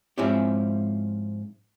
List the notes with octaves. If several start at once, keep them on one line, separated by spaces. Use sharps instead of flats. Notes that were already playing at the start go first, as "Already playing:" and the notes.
G#2 F3 C4 C#4 E4 G4